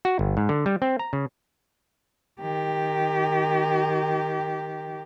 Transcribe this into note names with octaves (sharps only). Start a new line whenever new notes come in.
F#4
G1
G#2
D3
G3
C4
A#5
C#3
D#3 G4